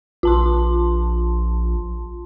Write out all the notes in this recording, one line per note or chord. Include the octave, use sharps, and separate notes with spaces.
A#1 F4 A5 C6